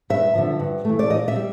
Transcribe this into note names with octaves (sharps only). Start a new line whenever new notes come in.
G2 E5
D3 F3
G2
E3 A3
D5
A#2 D#5
E5
G3